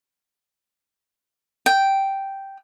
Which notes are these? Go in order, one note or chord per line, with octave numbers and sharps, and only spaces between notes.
G5